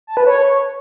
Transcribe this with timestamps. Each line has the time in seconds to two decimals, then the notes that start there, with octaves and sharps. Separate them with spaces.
0.07 A5
0.17 B4
0.27 C#5